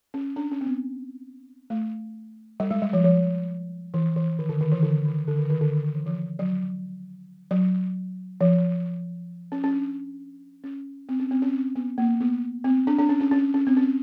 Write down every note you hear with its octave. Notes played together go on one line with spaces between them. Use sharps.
C#4
D4
C#4
C4
B3
A3
G3
G#3
G3
F3
F3
E3
E3
D#3
D3
D#3
E3
D3
D#3
D3
D#3
D#3
D3
D#3
D#3
E3
F3
F#3
F#3
F3
C#4
C#4
D4
C#4
C4
C#4
C4
C#4
C4
B3
A#3
B3
C4
D4
D4
C#4
C#4
C#4
C#4
C4
C#4